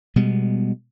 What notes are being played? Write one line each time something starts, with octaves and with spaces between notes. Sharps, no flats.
B2 G3 G#3 B3